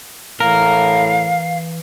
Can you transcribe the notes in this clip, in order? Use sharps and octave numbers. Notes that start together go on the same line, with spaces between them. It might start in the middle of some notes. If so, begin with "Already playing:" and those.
A2 E3 A#4 F5